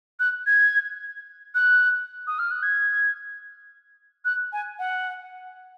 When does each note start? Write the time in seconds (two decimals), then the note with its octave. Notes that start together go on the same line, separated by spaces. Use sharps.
0.20 F#6
0.46 G#6
1.55 F#6
2.27 D#6
2.39 F6
2.51 F#6
2.63 G#6
4.25 F#6
4.53 G#5
4.79 F#5